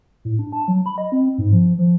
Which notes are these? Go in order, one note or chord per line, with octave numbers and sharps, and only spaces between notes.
A2
D4
A5
F#3
B5
D#5
C4
G#2
F3
F3